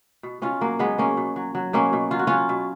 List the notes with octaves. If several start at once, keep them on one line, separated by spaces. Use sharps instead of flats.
B2
B2 C#4 F4
F#3 A#3
F#3 G#3 B3
B2 A#3 C#4
B2
F#3
F#3
B2 A#3 C#4
B2
F#3 F4
F#4
F#3 C#4 F4
B2